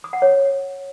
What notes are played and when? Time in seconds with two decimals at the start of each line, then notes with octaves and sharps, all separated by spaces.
0.04 D#6
0.13 F#5
0.22 C#5